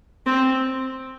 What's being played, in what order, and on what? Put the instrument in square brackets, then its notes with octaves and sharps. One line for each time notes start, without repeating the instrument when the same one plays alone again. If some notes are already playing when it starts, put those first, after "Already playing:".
[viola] C4